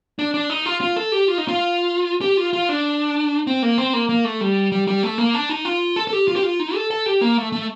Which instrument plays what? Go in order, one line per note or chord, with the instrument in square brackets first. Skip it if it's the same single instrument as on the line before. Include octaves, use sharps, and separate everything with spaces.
[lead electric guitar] D4
D4
D#4
F4
F4
A4
G4
F4
D#4
F4
G4
F4
F4
D4
C4
A#3
C4
A#3
A#3
A3
G3
G3
G3
A3
A#3
D4
D#4
F4
A4
A4
G4
F4
G4
F4
D#4
A4
A4
G4
A#3
A3
A3